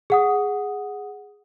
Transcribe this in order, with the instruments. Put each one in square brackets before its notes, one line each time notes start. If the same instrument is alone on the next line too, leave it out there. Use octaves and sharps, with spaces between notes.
[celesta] G#4 F#5 D#6